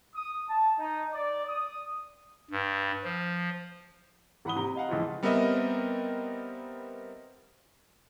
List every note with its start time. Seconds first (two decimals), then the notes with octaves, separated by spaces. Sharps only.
0.14 D#6
0.47 A5
0.77 D#4
1.13 D5
1.46 D#6
2.51 G2
3.04 F3
4.45 G#1 E3 F#5 B5 D#6 G7
4.56 C3 A#5
4.75 D#5 F5 F#5
4.89 C#2 E3 F3 F4
5.23 G3 B3 C4 A#4 D#5 E5